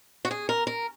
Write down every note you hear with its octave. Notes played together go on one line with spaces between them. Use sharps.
F#4
G#4
A#4
A#4